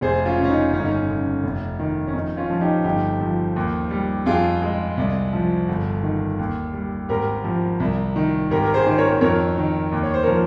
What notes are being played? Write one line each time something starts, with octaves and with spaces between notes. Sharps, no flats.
F1 G#4 C5
C#4 F4
C#3
C#4
D#4
G1 C#4
D#4
C#4
C#3
F1
D#3
C#4
F2 D#4
C#4 F4
F3
D#4 G4
G1 D#4 G4
F3
D#2
G3
F2 F4 G#4
G#3
C2
F3
G1
D#3
D#2
G3
G#1 G4 A#4
F3
C2
D#3
G#1 G4 A#4
A#4
G#4 C5
D#3 C5
A#4 C#5
F2 A#4 C#5
D#3
D#2
C#5
C5
F3 A#4 C#5